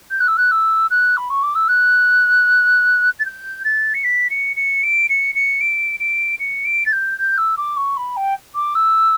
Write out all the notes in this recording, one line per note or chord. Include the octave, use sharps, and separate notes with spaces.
G6
F#6
E6
F#6
E6
F#6
B5
C#6
D6
E6
F#6
A6
G6
A6
C#7
B6
C#7
C#7
D7
C#7
C#7
D7
D7
C#7
D7
A6
G6
G6
E6
D6
C#6
B5
G5
D6
E6